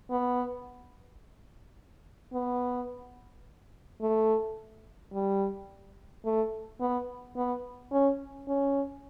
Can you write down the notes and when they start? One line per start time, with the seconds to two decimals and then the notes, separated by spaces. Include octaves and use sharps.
0.10 B3
2.33 B3
4.01 A3
5.13 G3
6.25 A3
6.80 B3
7.36 B3
7.91 C#4
8.48 C#4